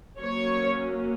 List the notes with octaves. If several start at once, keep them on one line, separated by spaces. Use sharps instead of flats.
F#3 A#3 C#4 C#5